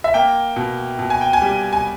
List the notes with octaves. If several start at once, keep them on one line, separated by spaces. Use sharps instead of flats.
E5
A#3 G5
B2
B2
G#5
G5
G#5
G3
G#5